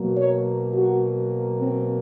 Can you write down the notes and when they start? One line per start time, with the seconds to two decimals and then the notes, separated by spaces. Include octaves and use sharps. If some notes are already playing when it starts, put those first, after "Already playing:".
Already playing: B2 F#3 A#3
0.17 C#5
0.73 F#4
1.59 C4